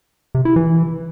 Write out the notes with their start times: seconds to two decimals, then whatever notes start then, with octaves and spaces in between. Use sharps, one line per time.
0.35 C3
0.45 E4
0.56 E3